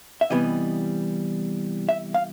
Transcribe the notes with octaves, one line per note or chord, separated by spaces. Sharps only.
E5
C3 E3 G3 B3 D#5
E5
F5